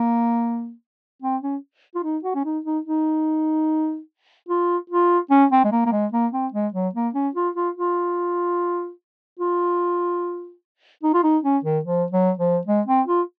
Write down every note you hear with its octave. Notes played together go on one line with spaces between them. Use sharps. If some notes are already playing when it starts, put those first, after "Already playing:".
Already playing: A#3
C4
C#4
F4
D#4
F#4
C#4
D#4
D#4
D#4
F4
F4
C#4
C4
G#3
A#3
A#3
G#3
A#3
C4
G#3
F#3
A#3
C#4
F4
F4
F4
F4
D#4
F4
D#4
C#4
D#3
F3
F#3
F3
G#3
C4
F4